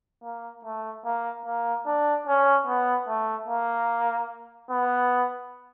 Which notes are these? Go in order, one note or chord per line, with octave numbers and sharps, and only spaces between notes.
A#3
A3
A#3
A#3
D4
C#4
B3
A3
A#3
B3